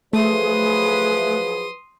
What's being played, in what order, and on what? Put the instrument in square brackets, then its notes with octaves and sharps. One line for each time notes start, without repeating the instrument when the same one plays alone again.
[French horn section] F3 F#3 B4 [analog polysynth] A3 [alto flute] G#4 [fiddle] C6 D#6